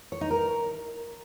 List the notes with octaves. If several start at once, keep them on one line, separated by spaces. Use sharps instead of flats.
C#5
D#4
A#4